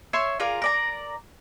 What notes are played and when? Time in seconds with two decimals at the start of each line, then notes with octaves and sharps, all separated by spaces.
0.13 C#5 E5 C6
0.40 F4 G#4 A#4 D5
0.62 A#4 D5 A#5